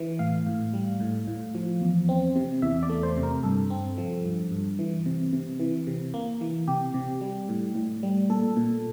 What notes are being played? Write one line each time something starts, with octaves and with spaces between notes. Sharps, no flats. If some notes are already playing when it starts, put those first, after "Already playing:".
Already playing: E3
A2 F5
A2
G3
A2
A2
F3
E2
C4
C3
E2 E5
D5
A3
C5
C3
A#4
G2 A4
C4
F3
G2
G2
E3
C3
C3
E3
C3
A#3
E3
C3 G4
C3
G3
A2
A2
G3
A#2 A4
A#2